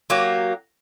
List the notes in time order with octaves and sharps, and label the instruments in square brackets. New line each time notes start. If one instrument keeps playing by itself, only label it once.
[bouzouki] F#3 A#3 G4